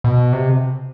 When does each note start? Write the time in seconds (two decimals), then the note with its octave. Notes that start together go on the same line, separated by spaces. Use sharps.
0.04 B2
0.33 C3